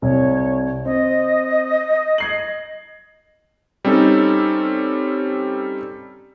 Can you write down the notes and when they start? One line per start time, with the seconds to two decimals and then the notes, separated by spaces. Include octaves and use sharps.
0.02 C2 C#5
0.85 C4 D#5
2.18 G#6 C7 F#7
3.85 G3 C4 C#4 D#4 A4